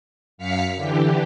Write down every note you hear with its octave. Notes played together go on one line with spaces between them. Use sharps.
F#2 F5 F6 B6 C#7
D3 E3 G4